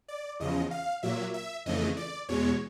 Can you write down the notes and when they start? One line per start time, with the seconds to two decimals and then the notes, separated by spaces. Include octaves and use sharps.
0.08 D5
0.40 E2 C#3 F3 D#5
0.71 F5
1.03 A#2 F#3 A#3 E5
1.34 E5
1.66 F2 C#3 E3 A3 D#5
1.97 D5
2.29 E2 B2 G#3 C#5